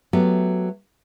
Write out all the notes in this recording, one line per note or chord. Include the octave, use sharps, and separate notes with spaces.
F#3 A3 B3 G4